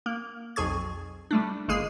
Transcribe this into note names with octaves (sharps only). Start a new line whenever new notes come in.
A#3
B1 F2 G#4 C#6 G#6
G3 A3 D4
G1 G#3 A#3 G#4 C7